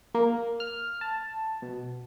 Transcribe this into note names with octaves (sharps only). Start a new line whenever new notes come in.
A#3
F6
A5
B2